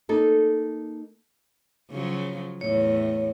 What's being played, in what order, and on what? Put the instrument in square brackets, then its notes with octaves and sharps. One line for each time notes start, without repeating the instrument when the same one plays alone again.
[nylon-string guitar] A#3 D#4 A4
[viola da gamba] C#3 F3 F#3
[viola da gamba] E2 A2 [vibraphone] C#5